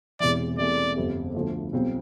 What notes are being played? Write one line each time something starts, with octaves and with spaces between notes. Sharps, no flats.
E1 E2 C3 E3 D5
E2 C3 E3 A3 D5
G1 F2 C3 G3
D2 D3 F3 A3
B1 B2 G3 C4 F4